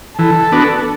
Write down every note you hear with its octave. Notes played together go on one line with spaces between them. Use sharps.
E3 A4
B3 D4 F#4